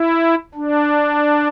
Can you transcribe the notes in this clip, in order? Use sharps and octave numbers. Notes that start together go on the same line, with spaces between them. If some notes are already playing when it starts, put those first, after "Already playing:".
Already playing: E4
D4